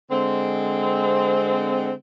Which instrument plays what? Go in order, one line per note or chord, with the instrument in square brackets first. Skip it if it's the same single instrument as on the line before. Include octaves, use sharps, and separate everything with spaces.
[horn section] D3 G#3 C4